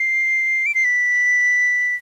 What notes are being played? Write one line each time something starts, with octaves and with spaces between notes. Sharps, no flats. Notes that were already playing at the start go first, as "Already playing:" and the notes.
Already playing: C7
D7
C7
B6